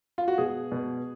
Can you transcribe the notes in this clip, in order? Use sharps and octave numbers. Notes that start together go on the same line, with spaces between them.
F4
F#4
B2 G#4
B2